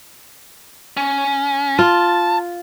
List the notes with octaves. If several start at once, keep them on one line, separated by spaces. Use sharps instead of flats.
C#4
F4 A5